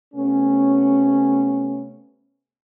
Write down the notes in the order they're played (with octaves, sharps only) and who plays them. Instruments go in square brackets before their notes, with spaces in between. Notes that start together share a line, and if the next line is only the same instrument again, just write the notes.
[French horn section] C3 A3 B3 C#4